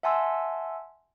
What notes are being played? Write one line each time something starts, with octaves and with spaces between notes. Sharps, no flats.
E5 F#5 G#5 A5 C6 E6